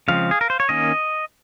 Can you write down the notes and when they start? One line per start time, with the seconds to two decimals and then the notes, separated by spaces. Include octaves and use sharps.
0.08 C#3 F3 G#3 C4 F5
0.31 G#4
0.41 A#4
0.50 C5
0.60 C#5
0.69 D#3 A#3 C#4 D#5